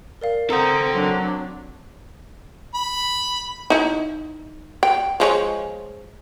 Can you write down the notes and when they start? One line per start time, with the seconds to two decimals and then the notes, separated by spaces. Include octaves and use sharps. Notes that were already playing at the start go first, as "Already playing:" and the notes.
0.21 A#4 D5 F5
0.50 C4 A4 A#4 F#5 A#5 D#6 G6
0.93 F#3 D4
2.74 B5
3.70 D#4 E4
4.83 G5
5.20 F3 G#3 C#5